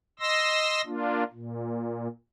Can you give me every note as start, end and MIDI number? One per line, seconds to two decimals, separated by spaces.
0.20 0.82 75
0.20 0.82 84
0.20 0.82 88
0.20 0.82 94
0.86 1.23 58
0.86 1.23 62
0.86 1.23 65
1.32 2.07 46